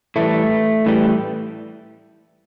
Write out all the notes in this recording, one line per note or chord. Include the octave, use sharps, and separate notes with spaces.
A2 E3 G3 A3
A2 E3 G3